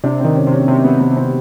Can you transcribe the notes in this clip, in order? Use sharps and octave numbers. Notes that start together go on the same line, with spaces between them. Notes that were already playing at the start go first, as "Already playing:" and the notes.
C3 D4
D#3 C4
C#4
C3
C#4
C3 C4
C3 B3
B3
C3
C4